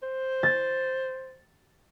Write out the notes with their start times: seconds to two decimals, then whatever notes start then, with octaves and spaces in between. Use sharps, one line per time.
0.03 C5
0.43 A6